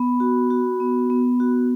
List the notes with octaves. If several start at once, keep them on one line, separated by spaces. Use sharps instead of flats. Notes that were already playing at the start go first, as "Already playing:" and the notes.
Already playing: B3 B5
F#4
F#4
B3
B3
F#4